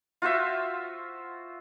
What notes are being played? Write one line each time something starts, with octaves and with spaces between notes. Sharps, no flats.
F4 F#4 C5 E5